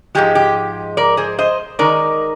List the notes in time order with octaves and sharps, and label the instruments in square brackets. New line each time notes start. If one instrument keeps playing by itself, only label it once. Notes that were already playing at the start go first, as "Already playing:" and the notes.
[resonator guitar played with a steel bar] G#2 F3 G#3 G4
G4
A#4 D5
G#4 C5
C5 D#5
D#3 G#3 D#4 A#4 D5